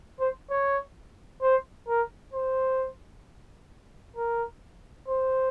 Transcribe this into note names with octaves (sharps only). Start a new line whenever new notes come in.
C5
C#5
C5
A#4
C5
A#4
C5